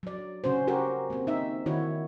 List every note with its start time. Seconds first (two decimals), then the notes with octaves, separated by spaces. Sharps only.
0.03 F#3 D5
0.44 C#3 C#4 F#4 C5
0.67 F#4 G4 A#4 C5
1.10 A#3 C4
1.27 D#4 E5
1.66 D#3 E4 F#4 C#5